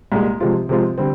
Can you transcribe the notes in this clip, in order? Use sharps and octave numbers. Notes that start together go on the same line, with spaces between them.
C2 A#2 G#3
C3 F3 G#3 C4 F4
C3 F3 G#3 C4 F4
D3 G3 C4